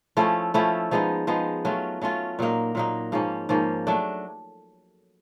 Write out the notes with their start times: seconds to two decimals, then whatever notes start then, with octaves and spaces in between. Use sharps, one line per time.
0.17 F3 A3 C#4 E4
0.54 F3 A3 C#4 E4
0.91 F3 G#3 B3 D#4
1.27 F3 G#3 B3 D#4
1.65 F#3 A3 C#4 F4
2.01 F#3 A3 C#4 F4
2.39 A#2 F#3 A#3 D#4
2.75 A#2 F#3 A#3 D#4
3.12 G#2 F3 A#3 C#4
3.49 G#2 F3 A#3 C#4
3.87 F#3 A3 D4